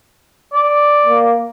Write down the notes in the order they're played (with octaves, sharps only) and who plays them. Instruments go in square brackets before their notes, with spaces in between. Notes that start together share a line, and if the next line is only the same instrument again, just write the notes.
[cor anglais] D5
[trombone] A#3